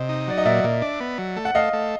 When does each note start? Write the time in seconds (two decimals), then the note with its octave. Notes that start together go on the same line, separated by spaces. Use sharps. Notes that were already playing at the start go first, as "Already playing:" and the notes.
Already playing: C3 D#5
0.09 D#4
0.27 F#3 D5
0.38 D#5
0.45 A#2 D5 E5
0.64 A#2
0.82 D4
1.00 B3
1.18 F#3
1.36 A3
1.45 F#5
1.55 A3 D#5 F5
1.73 A3